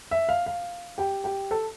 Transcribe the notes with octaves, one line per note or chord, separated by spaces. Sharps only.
E5
F5
F5
G4 G5
G4 G5
A4 A5